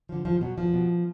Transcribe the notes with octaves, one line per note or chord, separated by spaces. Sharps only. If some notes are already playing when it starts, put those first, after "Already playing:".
D3 F3
E2 F3
B2 F#3
E2 F3
B2